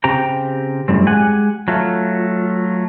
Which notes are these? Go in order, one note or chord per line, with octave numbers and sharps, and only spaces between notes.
C#3 C4 G4 G5 A#5
F#2 A2 G3 C4
G#3 G4 F#5 G#5
F#3 A3 F4